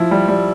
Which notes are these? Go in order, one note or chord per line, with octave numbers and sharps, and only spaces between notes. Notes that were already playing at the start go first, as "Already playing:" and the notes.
Already playing: F3 E4
G3
G3